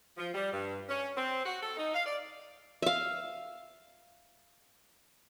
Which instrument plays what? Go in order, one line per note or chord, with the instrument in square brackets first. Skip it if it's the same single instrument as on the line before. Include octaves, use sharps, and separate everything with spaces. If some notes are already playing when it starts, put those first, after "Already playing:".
[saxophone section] F3
G3
G2
C#4
C4
F#4
A4
D#4
F5
D5
[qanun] E5 F5